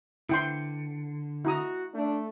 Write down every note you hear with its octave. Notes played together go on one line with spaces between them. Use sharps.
D3 E4 G5 C6
E4 F#4 A#5 D#6
A3 D4